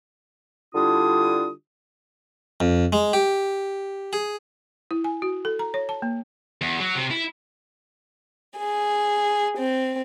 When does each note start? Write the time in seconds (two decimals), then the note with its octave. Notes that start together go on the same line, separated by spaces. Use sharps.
0.75 D3 G3 D4 E4 F4 D#6
2.60 F2
2.93 G#3
3.13 G4
4.13 G#4
4.91 E4
5.04 G#5
5.22 F#4
5.45 A4
5.59 A#5
5.74 C#5
5.89 A5
6.02 A#3
6.61 E2
6.80 F#3
6.95 C3
7.11 E4
8.57 G#4
9.57 C4